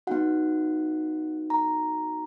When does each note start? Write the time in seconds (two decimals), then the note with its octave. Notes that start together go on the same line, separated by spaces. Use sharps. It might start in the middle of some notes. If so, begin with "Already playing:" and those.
0.07 B3 D#4 F#4 F#5
1.50 A#5